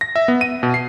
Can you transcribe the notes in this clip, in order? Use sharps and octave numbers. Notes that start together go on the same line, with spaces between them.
A#6
E5
B3
D#7
B2
C7